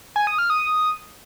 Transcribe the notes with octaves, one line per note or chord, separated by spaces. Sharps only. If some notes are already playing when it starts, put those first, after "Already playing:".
G#5
D#6
F6
D#6